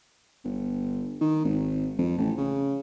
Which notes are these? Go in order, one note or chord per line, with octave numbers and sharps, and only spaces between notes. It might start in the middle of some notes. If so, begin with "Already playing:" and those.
G1
D#3
G#1
F2
A1
C#3